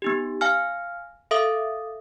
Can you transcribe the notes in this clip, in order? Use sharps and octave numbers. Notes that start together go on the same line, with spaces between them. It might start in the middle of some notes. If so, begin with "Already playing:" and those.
B3 D#4 G4
F5 G#5 F6
A4 E5 F5 D#6